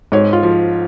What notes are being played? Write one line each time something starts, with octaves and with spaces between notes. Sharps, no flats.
G#2 C#5
F4
F3